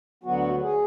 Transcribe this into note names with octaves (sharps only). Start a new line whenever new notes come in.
D2 D3 F#3 B3 F#4
G#4